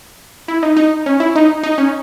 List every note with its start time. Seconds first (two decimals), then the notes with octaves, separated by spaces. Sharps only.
0.48 E4
0.63 D#4
0.76 D#4
1.06 C#4
1.20 E4
1.35 D#4
1.63 D#4
1.78 C#4